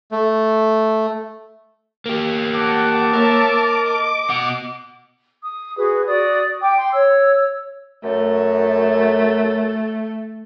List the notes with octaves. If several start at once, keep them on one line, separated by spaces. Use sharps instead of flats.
A3
A#3 G4
F#5 A5 D6
A#3 A#4 C#5 E5
D#5
B2 F#5
D#6
F#4 G#4 B4
F#4 D5 D#6
G5 D6
C6
C#5 E6
F#2 A3